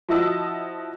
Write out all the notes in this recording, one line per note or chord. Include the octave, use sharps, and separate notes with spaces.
F3 E4 F#4 D#5 A5 E6